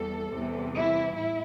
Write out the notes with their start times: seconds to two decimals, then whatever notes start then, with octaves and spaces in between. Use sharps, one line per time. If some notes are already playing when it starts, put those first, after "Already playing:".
Already playing: E2 E3 G3 A4
0.34 E2 C3 E3 G3
0.74 E4
1.14 A2 E4